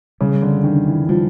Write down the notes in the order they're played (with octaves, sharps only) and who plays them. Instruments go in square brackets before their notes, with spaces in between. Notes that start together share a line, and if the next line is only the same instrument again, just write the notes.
[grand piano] C#3 [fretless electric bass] G3
[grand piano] D3
[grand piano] D#3 [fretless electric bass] D4
[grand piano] E3
[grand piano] F3 [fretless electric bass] G3